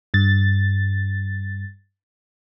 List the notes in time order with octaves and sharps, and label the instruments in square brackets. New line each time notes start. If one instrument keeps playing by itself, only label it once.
[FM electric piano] G2 A6